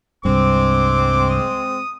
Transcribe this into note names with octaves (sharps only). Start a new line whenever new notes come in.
C2 G2 G#3 C4 D6
D#6